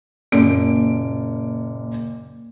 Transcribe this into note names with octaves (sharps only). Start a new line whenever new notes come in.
F#1 A#2 D7